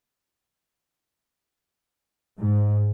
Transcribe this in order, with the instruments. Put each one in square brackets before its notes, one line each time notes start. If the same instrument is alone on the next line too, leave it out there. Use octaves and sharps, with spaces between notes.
[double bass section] G#2